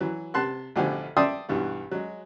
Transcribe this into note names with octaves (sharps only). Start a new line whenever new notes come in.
E3 F#3
C3 A5 C6 F#6
A1 B2 D3 F3 G4 G#5
D5 E5 G5 A5 C6 D#6
B1 G2 E3 B3
F#3 G#3